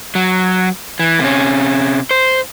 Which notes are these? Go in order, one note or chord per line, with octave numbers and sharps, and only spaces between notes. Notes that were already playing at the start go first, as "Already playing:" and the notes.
F#3
E3
C3 C#4
C5